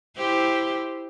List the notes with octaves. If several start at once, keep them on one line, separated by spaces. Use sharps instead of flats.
E4 G4 C5